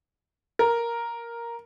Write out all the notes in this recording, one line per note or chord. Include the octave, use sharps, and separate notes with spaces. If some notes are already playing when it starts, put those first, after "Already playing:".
A#4